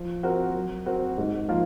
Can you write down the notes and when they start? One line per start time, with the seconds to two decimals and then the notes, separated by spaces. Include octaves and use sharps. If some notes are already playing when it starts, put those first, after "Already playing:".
Already playing: F3
0.23 C4 F#4 A#4
0.55 F#3
0.86 C4 F#4 A#4
1.18 G#2
1.48 F3 A#3 F4 A#4